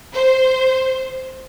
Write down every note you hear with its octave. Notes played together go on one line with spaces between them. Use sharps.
C5